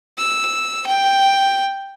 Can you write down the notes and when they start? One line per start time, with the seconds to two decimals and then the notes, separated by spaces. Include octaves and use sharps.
0.19 E6
0.87 G5